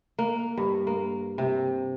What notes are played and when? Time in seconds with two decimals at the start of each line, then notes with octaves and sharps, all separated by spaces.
0.19 A#3
0.57 G2
0.87 A#3
1.38 C3